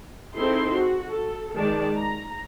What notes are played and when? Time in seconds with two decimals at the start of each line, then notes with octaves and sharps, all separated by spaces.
0.35 C4 D#4 E4 G#4 A4 C6
0.74 F#4
1.10 A4
1.55 D#3 G#3 D5 A5
1.98 A#5